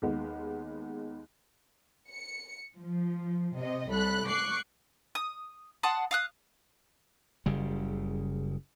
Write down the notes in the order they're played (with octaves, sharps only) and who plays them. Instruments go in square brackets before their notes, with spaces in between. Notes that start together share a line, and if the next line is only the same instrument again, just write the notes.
[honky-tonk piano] D#2 D#3 G#3 B3
[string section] C#7
F3
C3 D#5
C2 A4 B5 F#6
C#6 D6 F#6 C7
[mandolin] D#6
F#5 A5 C6 D#6
F5 D#6 F#6
[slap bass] F#1 C#3 G3